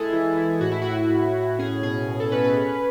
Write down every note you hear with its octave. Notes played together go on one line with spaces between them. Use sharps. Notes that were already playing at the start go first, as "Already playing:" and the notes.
Already playing: G#3 E4 G#4 A4
E3
E4
A2 F#4
E4
A2 F#4
A2
A2
C#4 G#4
B2 G#4
B2
A4
C#4 B4
B4
C#4